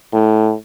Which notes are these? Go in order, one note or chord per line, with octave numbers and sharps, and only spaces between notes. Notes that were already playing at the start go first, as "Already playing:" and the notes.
A2